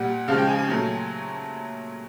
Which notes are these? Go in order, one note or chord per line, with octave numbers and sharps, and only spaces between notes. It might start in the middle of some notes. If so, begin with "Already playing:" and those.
Already playing: A#2 G3 F#5
C#3 F3 G#3 F5
G5
G#5
G#5
A#2 F#3 A3